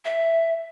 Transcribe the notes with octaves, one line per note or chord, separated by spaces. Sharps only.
E5